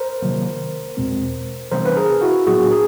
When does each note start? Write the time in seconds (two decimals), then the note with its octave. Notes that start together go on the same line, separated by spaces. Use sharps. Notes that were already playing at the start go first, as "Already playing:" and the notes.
Already playing: A#4 C5
0.22 C3 D#3 F#3 A#3
0.97 E2 B2 G#3 C4
1.72 C3 E3 G3 B3 D4 A#4 C5
1.85 B4
1.97 G#4 A#4
2.21 E4 F#4
2.47 A2 F#3 B3 D4 F#4 G#4
2.71 G#4 A#4